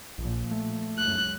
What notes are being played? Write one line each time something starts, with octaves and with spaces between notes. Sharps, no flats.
A#1 A#2 F3
A3
C#2 F#2 F#6